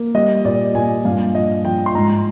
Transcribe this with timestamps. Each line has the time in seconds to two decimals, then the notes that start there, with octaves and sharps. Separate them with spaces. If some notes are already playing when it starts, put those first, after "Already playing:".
Already playing: A#3
0.15 G3 D#5
0.44 A#2 D5
0.74 A#2 G#5
1.05 G2 F5
1.35 F3 D#5
1.65 F3 G5
1.86 C6
1.95 G#2 A#5